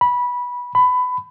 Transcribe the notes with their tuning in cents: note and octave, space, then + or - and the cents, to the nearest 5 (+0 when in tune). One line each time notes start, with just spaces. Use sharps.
B5 -15
B5 +20